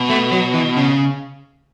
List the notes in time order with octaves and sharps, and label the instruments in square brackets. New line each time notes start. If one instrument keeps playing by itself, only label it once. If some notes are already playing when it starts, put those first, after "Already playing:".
Already playing: [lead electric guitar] B2
[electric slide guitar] A3
F#3
E3
C#3